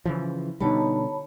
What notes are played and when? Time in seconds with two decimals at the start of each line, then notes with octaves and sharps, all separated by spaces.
0.06 C#3 E3 F3
0.61 B2 D3 G3 D#4 C#5 A5 B5